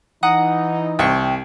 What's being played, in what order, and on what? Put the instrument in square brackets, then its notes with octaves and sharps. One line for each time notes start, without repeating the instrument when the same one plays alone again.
[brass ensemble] E3 D#4 [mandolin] F#5 A#5 D#6
[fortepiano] C2 [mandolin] G5 C#6